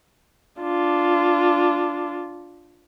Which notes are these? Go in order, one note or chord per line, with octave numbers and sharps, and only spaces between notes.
D4 F4